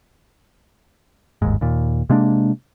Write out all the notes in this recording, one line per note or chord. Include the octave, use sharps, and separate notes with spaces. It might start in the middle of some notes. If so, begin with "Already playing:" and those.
G1 D#2 G#2
D#2 A#2
C3 G#3 A#3 D4